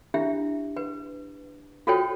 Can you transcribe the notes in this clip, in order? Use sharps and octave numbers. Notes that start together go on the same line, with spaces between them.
D4 E4 G4 E5
B4
F4 F#4 A4 C5 C#5 G5